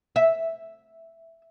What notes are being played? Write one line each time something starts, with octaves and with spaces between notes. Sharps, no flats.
E5